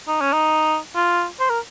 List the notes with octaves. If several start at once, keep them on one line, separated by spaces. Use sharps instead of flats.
D#4
C#4
D#4
F4
C5
A#4